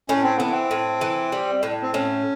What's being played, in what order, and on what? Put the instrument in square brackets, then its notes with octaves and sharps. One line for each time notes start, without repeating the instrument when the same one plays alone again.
[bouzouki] A2 [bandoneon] C#4
[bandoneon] C4
[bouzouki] E3 [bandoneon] B3
[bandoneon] C4
[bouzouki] A2
E3
G3
A2
[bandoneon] C4
[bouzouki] A2 [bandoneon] C#4